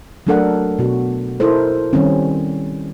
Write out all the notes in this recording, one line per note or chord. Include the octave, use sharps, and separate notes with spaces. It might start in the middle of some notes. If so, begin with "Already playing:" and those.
F#3 A3 D4 A4 A#4 F#5
B2 F#4
D#4 E4 A4 A#4 C5
D#3 G3 C4 C#4